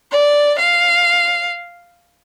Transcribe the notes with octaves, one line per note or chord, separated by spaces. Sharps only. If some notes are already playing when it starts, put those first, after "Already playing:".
D5
F5